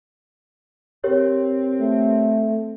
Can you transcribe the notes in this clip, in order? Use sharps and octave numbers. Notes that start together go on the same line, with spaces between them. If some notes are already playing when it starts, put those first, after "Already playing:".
C4 G4 A#4 C#5
A3